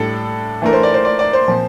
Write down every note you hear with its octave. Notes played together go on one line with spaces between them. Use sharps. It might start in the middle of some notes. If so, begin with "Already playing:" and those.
Already playing: A2 G3 D4 A4
E3 A3 D4 A#4
C5
D5
C5
D5
D5
C5
A#2 F3 C4